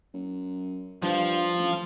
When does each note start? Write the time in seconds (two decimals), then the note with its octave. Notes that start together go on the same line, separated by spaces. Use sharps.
0.14 F#2
1.03 G2 F3
1.57 A1